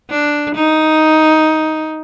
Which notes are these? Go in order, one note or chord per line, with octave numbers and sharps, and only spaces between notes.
D4
D#4